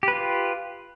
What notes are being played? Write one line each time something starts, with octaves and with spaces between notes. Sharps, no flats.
F4 G4 B4